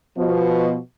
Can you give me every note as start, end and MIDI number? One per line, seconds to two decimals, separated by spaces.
0.17 0.78 47
0.17 0.78 53